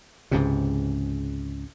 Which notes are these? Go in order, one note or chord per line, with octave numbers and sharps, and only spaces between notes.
C#2 G#2 C3